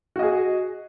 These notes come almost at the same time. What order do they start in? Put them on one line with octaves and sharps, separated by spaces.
F#4 D#5 G#4